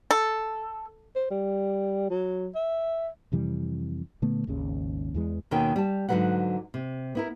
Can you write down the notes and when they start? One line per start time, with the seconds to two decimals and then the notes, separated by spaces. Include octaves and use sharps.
0.11 A4
1.16 C5
1.31 G3
2.10 F#3
2.55 E5
3.32 F2 C3 E3 G3
4.22 A#2 D3 A3 B3
4.47 G#1 D#2 C#3
5.14 E2 E3 G#3
5.51 D#2 B2 D#3 C#4 G5
5.76 G3 A5
6.09 G#2 D3 E3 F#3 B4 F#5
6.74 C3
7.15 B3 E4 A#4